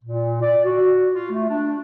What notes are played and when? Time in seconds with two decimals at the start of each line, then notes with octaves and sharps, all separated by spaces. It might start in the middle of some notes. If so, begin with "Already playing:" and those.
0.04 A#2
0.41 D5
0.65 F#4
1.13 F4
1.31 A3
1.49 D4